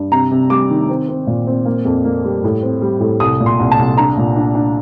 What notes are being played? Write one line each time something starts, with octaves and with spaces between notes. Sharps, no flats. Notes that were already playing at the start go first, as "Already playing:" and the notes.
Already playing: G2
C3 A#5
C3
G3 D6
D#3
C4
C4
A#2
C4
A#3
F2
A#3
G3
A2
C4
G3
A2
C2 D#6
A#2
C6
C2
A5
C2
D4 A#5
A#2
D4
D4